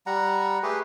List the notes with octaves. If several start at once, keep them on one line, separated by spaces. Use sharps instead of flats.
G3 F#5 A#5
A3 G4 G#4 B4